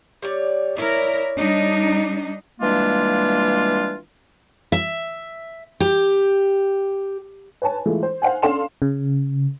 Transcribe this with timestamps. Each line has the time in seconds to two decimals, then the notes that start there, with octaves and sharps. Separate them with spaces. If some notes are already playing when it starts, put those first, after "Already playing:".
0.22 G3 C#5 D5
0.77 E4 A#4 C#5 D5
1.37 G3 D4 D#4
2.61 E3 G3 G#3 A#3 D4 F4
4.72 E5
5.80 G4
7.62 B4 C#5 G#5 A5
7.86 E3 G#3 A3 F4
8.03 C5
8.22 C5 F5 F#5 G#5
8.42 C#4 D4 A4 F5 C6 E7
8.82 C#3